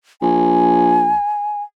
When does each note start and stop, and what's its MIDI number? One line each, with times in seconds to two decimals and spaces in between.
0.22 1.15 34
0.22 1.62 80